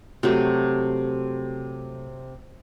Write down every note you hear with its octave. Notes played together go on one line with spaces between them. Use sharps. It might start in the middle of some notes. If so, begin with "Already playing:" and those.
C3 F#3 A3